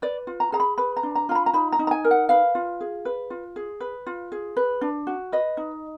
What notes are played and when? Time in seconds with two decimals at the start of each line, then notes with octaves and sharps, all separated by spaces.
0.02 B4 D5
0.27 F4
0.40 A#5
0.52 G#4 A#5
0.60 B5
0.78 B4 B5
0.97 A#5
1.03 D4
1.15 A#5
1.29 F4 A#5
1.35 B5
1.46 A#5
1.53 D#4 B5
1.72 A#5
1.79 D#4
1.87 A#5
1.91 G#5
2.04 A#4
2.11 F#5
2.29 B4 F5
2.55 F4
2.81 G#4
3.05 B4
3.30 F4
3.56 G#4
3.80 B4
4.07 F4
4.32 G#4
4.57 B4
4.81 D4
5.07 F#4
5.32 B4 D#5
5.57 D#4